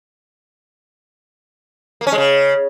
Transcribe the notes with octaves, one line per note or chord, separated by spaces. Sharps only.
A#3
C#4
G#3
C#3